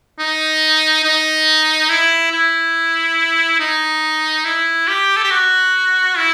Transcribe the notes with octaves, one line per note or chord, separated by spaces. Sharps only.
D#4
D#4
E4
E4
D#4
E4
G4
A4
G4
F#4
E4